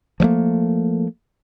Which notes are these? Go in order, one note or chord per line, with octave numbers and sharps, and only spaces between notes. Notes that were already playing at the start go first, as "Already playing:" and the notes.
F3 G3 A3 A#3